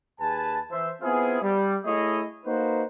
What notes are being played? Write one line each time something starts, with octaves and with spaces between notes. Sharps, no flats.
D#2 G#4 B4 G#5 A5
E3 C5 E5
B3 C4 E4 F4 G#4
G3
A3 E4 G#4 C#5 D#5
A#3 D#4 F#4 B4 C5